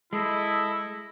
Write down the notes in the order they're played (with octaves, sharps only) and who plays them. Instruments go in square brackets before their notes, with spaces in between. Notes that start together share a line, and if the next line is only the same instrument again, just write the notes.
[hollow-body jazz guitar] G#3 [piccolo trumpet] E4 [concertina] A4 D#5